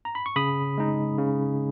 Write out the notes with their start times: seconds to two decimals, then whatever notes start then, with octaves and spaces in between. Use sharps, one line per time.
0.05 A#5
0.15 B5
0.26 C#6
0.36 C#3 B5 D#6
0.78 G#3 D#4
1.18 C#3